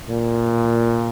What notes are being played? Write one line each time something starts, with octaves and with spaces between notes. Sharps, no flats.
A#2